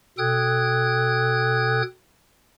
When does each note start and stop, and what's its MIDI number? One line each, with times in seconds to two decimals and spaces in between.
0.18 1.82 47
0.18 1.82 69
0.18 1.82 79
0.18 1.82 87
0.18 1.82 90
0.18 1.82 92